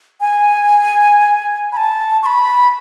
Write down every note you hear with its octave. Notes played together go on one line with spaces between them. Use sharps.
G#5
B5
A5
C#6
B5